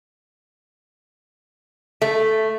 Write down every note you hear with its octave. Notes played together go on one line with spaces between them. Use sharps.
A3